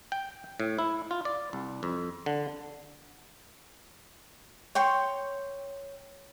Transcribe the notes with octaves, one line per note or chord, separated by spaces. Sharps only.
G5
A2
E4
F4
D5
C2
F2
D3
C#5 G5 C6 C#6